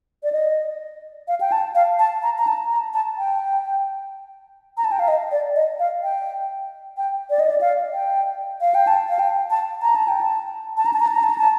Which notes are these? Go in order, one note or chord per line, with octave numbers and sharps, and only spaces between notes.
D5
D#5
F5
G5
A5
F5
A5
A#5
A#5
A5
A#5
A5
G5
A#5
A5
G5
F5
D#5
D5
D#5
F5
G5
G5
D5
D#5
D5
F5
G5
F5
G5
A5
F5
G5
A5
A#5
A5
G5
A5
A5
A#5
A5
A#5
A5
A#5
A5
A#5
A5